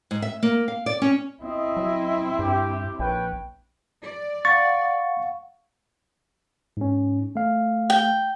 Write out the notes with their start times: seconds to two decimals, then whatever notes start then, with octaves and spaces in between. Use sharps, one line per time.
0.11 G#2
0.22 E5
0.43 A#3
0.68 F5
0.86 D5
1.02 C#4
1.43 C4 E4 D#5
1.77 F#3
2.39 G2 G4
2.99 A#1 B4 C#5 G5
4.02 D5
4.45 F5 F#5 C#6 A6
6.77 G#2 C#4
7.35 A3 F5
7.90 G5